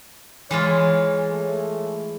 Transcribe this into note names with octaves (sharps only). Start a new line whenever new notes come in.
E3 G#3 F4 C#5
A3